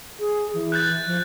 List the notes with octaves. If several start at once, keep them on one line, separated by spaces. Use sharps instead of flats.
G#4
E3
F#6 G6 A6
F3